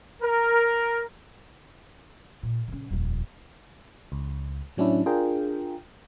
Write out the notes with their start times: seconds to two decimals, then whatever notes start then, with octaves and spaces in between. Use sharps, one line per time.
0.23 A#4
2.43 A#2
2.68 C#3 C#4
2.90 D#1 F2
4.12 C#2
4.77 A2 F#3 C#4 D4 E4
5.06 D4 F4 G#4 A#4 G5